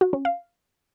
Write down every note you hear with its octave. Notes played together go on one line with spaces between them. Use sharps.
F#4
C#4
F5